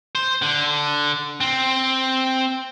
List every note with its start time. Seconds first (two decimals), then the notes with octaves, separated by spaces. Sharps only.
0.15 C5
0.42 D3
1.41 C4